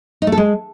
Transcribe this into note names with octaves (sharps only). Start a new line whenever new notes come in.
D#4
A3
A4
G#3